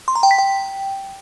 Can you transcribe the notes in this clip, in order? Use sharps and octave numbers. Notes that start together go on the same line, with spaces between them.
C6
A#5
G5
B6
G5